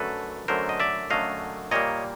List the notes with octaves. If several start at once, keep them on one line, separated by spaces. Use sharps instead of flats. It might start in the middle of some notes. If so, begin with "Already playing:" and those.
Already playing: F#2 D3 F#3 A3 A4 B4
F#2 D3 F#3 A3 A#4 C5
D#5
D5 E5
F#2 D3 F#3 A3 D#5 F5
A#2 G3 A#3 C#5 D#5